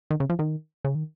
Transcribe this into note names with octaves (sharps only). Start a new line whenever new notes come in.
D#3
C#3
F3
D#3
C#3
D#3